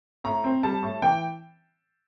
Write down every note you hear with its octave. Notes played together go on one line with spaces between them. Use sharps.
A2 A#5
C4
G3 A5
A2
E3 G5